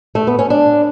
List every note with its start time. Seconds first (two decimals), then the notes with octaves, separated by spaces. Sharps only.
0.15 A3
0.27 B3
0.39 C#4
0.50 D4